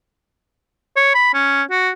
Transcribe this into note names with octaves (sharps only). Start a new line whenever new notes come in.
C#5
B5
C#4
F#4